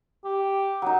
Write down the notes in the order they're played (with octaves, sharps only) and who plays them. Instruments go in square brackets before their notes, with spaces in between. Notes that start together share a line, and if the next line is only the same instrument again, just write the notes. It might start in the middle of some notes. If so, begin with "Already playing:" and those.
[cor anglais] G4
[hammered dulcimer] F#3 D#4